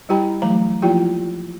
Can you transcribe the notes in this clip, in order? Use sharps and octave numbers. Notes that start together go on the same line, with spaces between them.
G3 E4 G4 G5 A#5 B5
E3 F#3 A3 A#5
F3 A#3 E4 F4 G4 G5